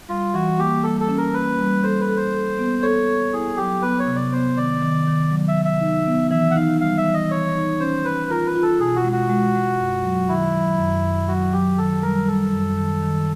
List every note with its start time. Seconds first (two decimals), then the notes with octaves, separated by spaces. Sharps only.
0.09 G3 F4
0.34 E3 F#4
0.58 A#3 G4
0.83 G3 A4
1.01 A4
1.09 C#4
1.17 A#4
1.34 A#3 B4
1.59 G3
1.83 A4 C5
2.00 B4
2.08 A4
2.17 C5
2.33 A4
2.59 B3
2.82 A4 C#5
3.08 A4
3.33 E4 G#4
3.57 F#3 G4
3.82 B3 B4
3.99 C#5
4.07 C3
4.16 D5
4.32 B3 C5
4.57 D#3 D5
4.82 D#3
5.07 D#3
5.31 F#3
5.48 E5
5.57 C3
5.65 E5
5.81 D#4
6.07 B3
6.31 E3 E5
6.51 F#5
6.56 D#4 F5
6.80 G3 F5
6.97 E5
7.06 E3
7.14 D#5
7.30 E3 C#5
7.55 D#4
7.80 C#4 C5
8.05 C#4 B4
8.30 F4 A#4
8.47 B4
8.55 F4
8.62 A4
8.79 B2 G#4
8.96 F#4
9.04 G#3
9.12 F#4
9.30 G#3
9.55 G#3
9.79 F#2
10.04 F#3
10.29 D#3 E4
10.54 F#3
10.79 F#2
11.04 F#2
11.28 F#3 F#4
11.53 F#3 G4
11.78 D#3 A4
12.03 G3 A#4
12.28 G3 A4
12.53 F#2
12.77 D#3
13.02 D#3